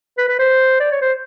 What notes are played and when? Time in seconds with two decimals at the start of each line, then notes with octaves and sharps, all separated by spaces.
0.18 B4
0.29 B4
0.39 C5
0.80 D5
0.92 C#5
1.02 C5